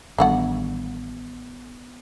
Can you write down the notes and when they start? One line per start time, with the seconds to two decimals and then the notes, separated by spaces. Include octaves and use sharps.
0.18 A1 D3 D#3 G3 B3 F#4 F#5